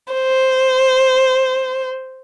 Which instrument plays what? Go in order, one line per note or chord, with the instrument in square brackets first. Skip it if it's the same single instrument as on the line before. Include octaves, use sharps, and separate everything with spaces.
[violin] C5